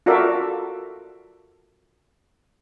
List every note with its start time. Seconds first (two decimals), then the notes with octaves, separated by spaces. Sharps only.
0.06 F4 F#4 A4 A#4 D5 E5